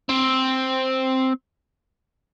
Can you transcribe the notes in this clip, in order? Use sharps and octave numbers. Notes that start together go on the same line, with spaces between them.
C4